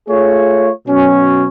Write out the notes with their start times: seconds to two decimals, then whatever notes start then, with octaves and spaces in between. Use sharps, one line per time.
0.08 A3 F4 G#4 C#5
0.86 B2 F#3 C#4